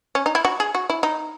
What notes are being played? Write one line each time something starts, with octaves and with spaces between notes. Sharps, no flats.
C#4
D#4
E4
F#4
G#4
F#4
E4
D#4